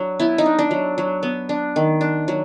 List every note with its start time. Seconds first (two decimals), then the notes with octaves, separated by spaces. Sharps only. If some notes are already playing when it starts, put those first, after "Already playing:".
Already playing: F#3 D4
0.19 B3 E4
0.38 D#4
0.46 D4
0.59 D4
0.71 F#3
0.98 F#3
1.23 B3
1.49 D4
1.76 D#3
2.01 D4
2.28 F#3